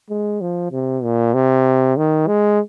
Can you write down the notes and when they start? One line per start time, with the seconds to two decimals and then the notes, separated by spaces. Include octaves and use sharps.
0.10 G#3
0.41 F3
0.72 C3
1.04 A#2
1.34 C3
1.97 D#3
2.28 G#3